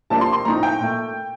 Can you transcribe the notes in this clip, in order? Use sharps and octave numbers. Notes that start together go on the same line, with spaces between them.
C3 F3 A#3 D4 A5
C6
C6
A2 F3 C4 D#4 A#5
G5
A#2 A3